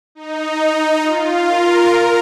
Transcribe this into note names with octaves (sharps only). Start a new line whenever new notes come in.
D#4
D#4
F4
A#4
A#4